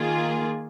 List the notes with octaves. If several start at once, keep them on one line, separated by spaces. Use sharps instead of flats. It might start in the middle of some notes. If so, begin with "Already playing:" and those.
Already playing: D#3 A#3 F4 G#4